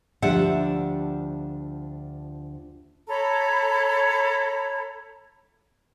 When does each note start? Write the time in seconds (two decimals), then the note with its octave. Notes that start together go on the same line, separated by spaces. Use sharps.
0.22 D2 F3 D4 G4 E5 F#5
3.09 A4 C#5 A#5 B5